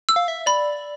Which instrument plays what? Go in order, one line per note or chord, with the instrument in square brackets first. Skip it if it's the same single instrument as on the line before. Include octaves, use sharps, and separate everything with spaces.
[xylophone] E6
[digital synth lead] F5
E5
[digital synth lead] D5 [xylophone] B5